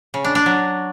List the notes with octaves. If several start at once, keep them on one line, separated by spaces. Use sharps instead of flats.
C#3
D4
D4
F#3